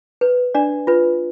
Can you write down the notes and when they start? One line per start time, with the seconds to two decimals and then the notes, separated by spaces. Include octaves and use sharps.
0.21 B4
0.55 D4 D5
0.87 F4 B4